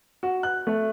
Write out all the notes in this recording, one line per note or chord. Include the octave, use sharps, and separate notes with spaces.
F#4
F#6
A3